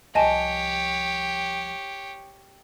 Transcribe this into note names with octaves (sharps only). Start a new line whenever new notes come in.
C2 F3 G4 C#5 D#5 G#5 A5